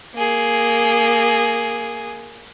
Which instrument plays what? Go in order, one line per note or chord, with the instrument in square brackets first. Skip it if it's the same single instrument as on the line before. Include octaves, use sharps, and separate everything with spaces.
[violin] A#3 G#4